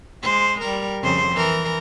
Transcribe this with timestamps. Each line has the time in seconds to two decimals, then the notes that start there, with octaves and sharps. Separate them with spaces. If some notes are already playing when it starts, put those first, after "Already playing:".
0.22 G#3 C5
0.61 G3 A#4
1.03 F2 C#3 C5
1.33 E3 A#4